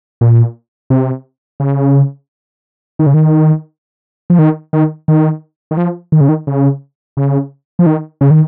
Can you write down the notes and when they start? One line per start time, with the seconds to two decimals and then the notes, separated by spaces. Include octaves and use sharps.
0.21 A#2
0.90 C3
1.60 C#3
2.99 D#3
3.06 C#3
3.14 D#3
4.30 F3
4.39 D#3
4.73 D#3
5.08 D#3
5.71 D#3
5.77 F3
6.12 D#3
6.21 C#3
6.29 D#3
6.47 C#3
7.17 C#3
7.79 F3
7.86 D#3
8.21 C#3
8.31 D#3